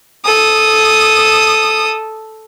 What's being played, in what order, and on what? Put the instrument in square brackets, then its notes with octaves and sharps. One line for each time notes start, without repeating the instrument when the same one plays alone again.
[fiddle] A4 D#6